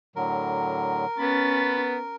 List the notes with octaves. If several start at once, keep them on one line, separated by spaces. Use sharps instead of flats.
A2 D3 F#3 A#4
B3 C#4 B5 A6